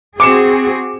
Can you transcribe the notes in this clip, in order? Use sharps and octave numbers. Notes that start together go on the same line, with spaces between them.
C4 F#4 G#4 D6 C#7 E7